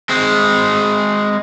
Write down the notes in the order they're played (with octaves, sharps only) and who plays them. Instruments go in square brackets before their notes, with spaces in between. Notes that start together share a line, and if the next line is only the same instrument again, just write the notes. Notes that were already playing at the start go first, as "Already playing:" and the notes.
[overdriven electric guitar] G#3 C4